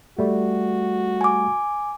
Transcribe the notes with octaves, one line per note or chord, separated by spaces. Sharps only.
G3 A3 F#4
G#5 D6